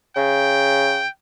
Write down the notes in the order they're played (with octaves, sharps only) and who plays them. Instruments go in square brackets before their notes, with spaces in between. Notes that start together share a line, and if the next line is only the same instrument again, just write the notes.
[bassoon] C#3 [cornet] G5